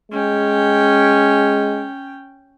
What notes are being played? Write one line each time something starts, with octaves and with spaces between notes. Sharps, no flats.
G#3 C#4 G5